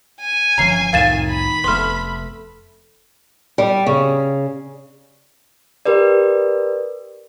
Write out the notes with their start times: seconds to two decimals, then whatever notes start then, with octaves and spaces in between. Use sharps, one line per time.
0.21 G#5
0.58 G1 E3 F3 C#4 A#5 C7
0.93 C2 F2 A2 D#3 A#4 F5 A6 E7
1.29 B5
1.64 F1 A3 B3 C6 F6
3.58 G3
3.86 C#3
5.86 G4 A#4 B4 D5